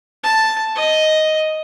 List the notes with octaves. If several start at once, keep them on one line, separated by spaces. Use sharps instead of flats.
A5
D#5